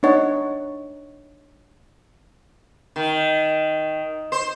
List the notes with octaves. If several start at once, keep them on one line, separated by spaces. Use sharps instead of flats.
D4 D#4 C#5 F#5
D#3
C5